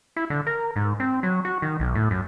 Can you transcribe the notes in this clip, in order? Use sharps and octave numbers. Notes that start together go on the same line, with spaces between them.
E4
D3
A#4
G#2
C4
F#3
F#4
D#3
B1
A2
F#2